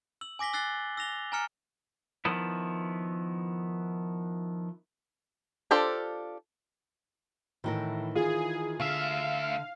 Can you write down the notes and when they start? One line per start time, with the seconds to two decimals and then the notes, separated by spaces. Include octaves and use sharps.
0.21 E6 F#7
0.39 G#5 D6 A#6 B6 G7
0.53 E6 F#6 A6 C7 G7
0.97 E6 A#6 F7 G7
1.32 G#5 A#5 F6 C#7
2.25 D#3 F3 B3 E4
5.71 D4 F4 G4 A4 C5
7.64 A2 D#3 E3 A#4
8.15 F4 G#4
8.80 D2 D3 E5 F5